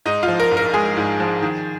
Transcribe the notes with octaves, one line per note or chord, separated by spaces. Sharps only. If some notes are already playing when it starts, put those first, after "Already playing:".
G#2 D#4
F4
F3
A#4
A#1
A#4
G#3 G#4
G#2
F3
D#3